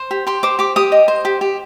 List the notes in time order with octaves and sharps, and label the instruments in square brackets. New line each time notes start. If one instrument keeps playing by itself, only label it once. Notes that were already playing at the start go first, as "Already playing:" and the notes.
Already playing: [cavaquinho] C5
G4
G4 C6
C5 D6
G4 D6
G4 D#6
D#5
C5
G4
G4